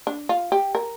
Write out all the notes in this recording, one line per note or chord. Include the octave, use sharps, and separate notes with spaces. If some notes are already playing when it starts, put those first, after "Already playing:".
D4
F4
G4
A#4